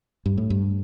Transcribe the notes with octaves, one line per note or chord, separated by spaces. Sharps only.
G2
A2
G2